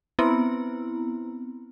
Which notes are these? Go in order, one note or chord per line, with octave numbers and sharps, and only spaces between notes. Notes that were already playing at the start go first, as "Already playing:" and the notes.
B3 C4 E4 A#5